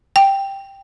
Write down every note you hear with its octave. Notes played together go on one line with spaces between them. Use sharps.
G5